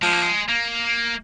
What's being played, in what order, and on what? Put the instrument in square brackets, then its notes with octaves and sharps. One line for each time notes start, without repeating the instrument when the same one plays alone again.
[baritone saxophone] F3 [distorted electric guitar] G#3
[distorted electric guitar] A#3
G#3
A#3